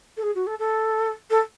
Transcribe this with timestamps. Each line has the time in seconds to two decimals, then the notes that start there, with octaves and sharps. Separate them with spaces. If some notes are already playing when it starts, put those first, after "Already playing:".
0.17 A4
0.23 G#4
0.35 F#4
0.47 A4
0.59 A4
1.30 A4